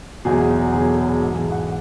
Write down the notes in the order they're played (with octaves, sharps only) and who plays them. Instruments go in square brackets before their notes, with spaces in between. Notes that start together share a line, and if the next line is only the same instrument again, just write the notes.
[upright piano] E2 B2 F#3 G#4
E2 B2 F#3 G#4
A4
G#4
G#2 E3 A4
G#4
F#5